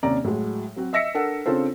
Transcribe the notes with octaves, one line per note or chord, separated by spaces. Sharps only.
D#2 C3 C#4 D5 A#5
A2 F#3 G#3
F#3 C4 F#4
D#5 E5 E6 A#6 B6 C#7
D4 A4 A#4 F#5
C#3 C4 D4 F4 A4 C5